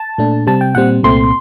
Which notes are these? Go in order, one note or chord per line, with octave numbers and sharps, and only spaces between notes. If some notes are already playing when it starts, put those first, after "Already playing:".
Already playing: A5
A#2 A3 D4
C3 G3 C4 A5
G5
A#2 G3 C4 F#5
C2 A#2 A3 C4 C6